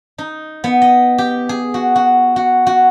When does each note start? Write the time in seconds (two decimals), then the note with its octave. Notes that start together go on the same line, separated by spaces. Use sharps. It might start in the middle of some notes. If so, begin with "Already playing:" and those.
0.18 D#4
0.64 B3
0.82 D#5
1.18 G4
1.49 G#4
1.74 F#4
1.96 F#4
2.36 F#4
2.67 F#4